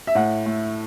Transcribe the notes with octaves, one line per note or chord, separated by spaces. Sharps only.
E5
A2 F#5
A3